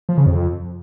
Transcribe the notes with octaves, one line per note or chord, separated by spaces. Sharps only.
F3
C#3
F2